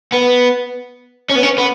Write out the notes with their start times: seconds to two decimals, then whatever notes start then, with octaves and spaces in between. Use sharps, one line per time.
0.12 B3
1.29 C#4
1.36 B3
1.43 C#4
1.58 B3